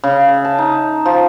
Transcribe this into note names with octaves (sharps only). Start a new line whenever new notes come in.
C#3
E5
A5
D#4
F3